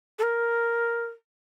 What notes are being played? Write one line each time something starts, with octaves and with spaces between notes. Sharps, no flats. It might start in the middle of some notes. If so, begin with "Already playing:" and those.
A4
A#4